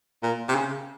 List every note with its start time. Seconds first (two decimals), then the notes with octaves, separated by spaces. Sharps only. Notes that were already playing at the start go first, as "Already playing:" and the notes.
0.23 A#2
0.49 C3
0.55 C#3